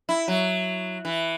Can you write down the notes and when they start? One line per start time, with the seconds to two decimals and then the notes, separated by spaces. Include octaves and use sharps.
0.09 E4
0.28 F#3
1.05 E3